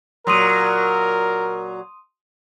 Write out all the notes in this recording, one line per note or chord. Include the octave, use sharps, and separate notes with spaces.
A#2 F#3 A#4 C6 D#6 D#7